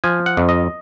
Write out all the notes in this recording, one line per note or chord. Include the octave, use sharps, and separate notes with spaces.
F3 G#5
F#5
F2
D#5